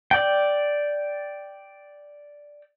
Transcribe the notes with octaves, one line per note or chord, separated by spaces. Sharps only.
D5 G5